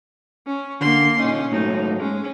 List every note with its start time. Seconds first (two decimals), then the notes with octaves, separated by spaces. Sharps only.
0.47 C#4
0.81 D3 A#3 C6
1.20 A#2 C#4 D#4
1.52 G#2 F#3 A3 D#4
2.00 G#3 C#4